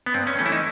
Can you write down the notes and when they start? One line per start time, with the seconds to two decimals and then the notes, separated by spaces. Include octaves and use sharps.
0.06 B3
0.14 G2 C4
0.27 C#4
0.39 E3 A3 C#4
0.46 E4
0.52 D#4